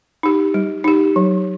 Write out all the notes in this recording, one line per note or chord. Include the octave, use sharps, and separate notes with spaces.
D#4 G4
G3
D#4 G4
F#3